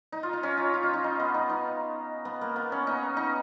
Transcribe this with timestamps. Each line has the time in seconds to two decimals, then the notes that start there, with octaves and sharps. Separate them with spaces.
0.12 D#4
0.23 F4
0.33 D#4
0.43 C#4
0.58 F4
0.74 F4
0.83 D#4
0.94 D#4
1.04 D#4
1.20 B3
1.34 D#4
1.49 D#4
2.25 B3
2.41 A#3
2.56 B3
2.72 C#4
2.87 D#4
3.17 D#4